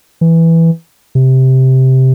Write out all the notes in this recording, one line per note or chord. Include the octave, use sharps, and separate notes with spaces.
E3
C3